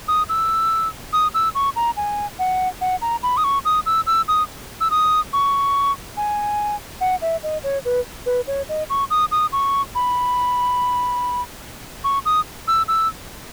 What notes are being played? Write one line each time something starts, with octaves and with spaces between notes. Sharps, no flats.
D#6
E6
D#6
E6
C#6
A#5
G#5
F#5
F#5
A#5
B5
D#6
C#6
D#6
E6
E6
D#6
E6
D#6
C#6
G#5
F#5
E5
D#5
C#5
B4
B4
C#5
D#5
C#6
D#6
D#6
C#6
B5
C#6
D#6
E6
E6